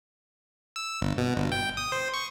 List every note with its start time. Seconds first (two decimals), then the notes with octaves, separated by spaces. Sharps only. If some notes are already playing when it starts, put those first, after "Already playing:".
0.76 E6
1.02 G1
1.18 B2
1.37 G1
1.52 G5
1.77 D#6
1.92 C5
2.14 C#6